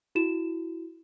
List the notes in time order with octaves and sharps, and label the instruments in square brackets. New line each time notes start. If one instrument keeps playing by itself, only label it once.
[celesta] E4 F#4 E7